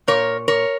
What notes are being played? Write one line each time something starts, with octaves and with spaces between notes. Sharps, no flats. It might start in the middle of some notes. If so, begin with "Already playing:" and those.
A#2 A#4 C#5
A#4 C#5